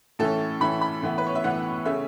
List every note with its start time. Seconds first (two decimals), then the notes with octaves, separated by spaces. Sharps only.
0.19 A2 E3 C#4 A4
0.60 A2 E3 C#4 B5
0.81 B5
1.02 A2 E3 B3
1.18 B4
1.27 C#5
1.35 E5
1.44 A2 E3 B3 F#5
1.85 C#3 A3 C#4 E5